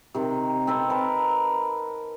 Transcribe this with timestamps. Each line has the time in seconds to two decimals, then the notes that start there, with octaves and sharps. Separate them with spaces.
0.14 C3 D#3
0.67 C4 A4 B4
0.90 A#4 B4 A5